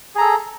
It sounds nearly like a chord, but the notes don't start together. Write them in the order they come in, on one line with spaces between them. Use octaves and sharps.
G#4 A#5 A4